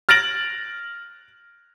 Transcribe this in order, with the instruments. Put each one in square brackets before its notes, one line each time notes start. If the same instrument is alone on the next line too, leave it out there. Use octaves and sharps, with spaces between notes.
[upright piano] F6 A6 A#6 D7 F#7